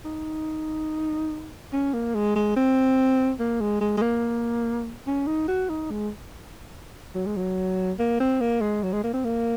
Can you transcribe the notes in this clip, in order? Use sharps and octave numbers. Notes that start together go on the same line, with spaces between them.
D#4
C#4
A#3
G#3
G#3
C4
A#3
G#3
G#3
G#3
A#3
C#4
D#4
F#4
D#4
G#3
F#3
G#3
F#3
A#3
C4
A#3
G#3
F#3
G#3
A#3
C4
A#3